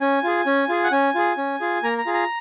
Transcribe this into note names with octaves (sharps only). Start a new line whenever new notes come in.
C#4 G#5
F4 G#4
C#4
F4 G#4
F#5
C#4 G#5
F4 G#4
C#4
F4 G#4
A#3 A#5
A#5
F4 G#4
A#5